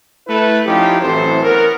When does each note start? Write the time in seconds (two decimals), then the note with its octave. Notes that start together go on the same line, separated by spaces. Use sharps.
0.28 A3 E4 B4
0.66 F3 C#4 D#4 E4 G4
1.02 A1 E3 F#3 C4 A4 C5
1.44 E3 B3 C#4 A#4